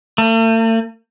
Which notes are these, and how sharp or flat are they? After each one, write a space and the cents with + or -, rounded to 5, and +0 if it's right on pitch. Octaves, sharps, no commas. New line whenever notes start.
A3 +45